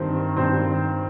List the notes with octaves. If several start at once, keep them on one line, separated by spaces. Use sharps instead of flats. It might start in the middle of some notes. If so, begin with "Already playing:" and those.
Already playing: G2 D#3 C4 C5
G2 D#3 C4 C5